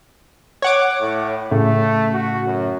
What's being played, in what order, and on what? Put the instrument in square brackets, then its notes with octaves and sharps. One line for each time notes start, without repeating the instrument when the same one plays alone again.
[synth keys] C#5 F#5 D6
[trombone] A2
[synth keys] A2 C#3 [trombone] A3
[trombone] F#4
F#2